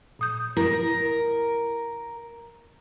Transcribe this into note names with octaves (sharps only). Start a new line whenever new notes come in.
A#2 D#6 G6
E4 A#4